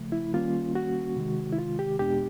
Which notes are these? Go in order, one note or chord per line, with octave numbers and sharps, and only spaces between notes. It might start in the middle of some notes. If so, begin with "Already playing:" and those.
Already playing: C#3 F3 A3
E4
D#3 G3 A#3 C#4 F4
F#4
C3 D#3 G#3
E4
F4
G4
E2 B2 G#3 B3 D4 G4